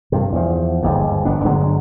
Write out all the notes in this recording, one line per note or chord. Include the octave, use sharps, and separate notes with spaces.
G2 C3
E2 F3
G1 D#2 G#2
G1 B3 D4
G2 D3 F#3 G#3